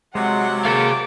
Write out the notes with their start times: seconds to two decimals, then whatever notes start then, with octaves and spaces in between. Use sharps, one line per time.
0.15 C3 F#3 G#3 F#5
0.65 A#3 G#4 A4 F5 D6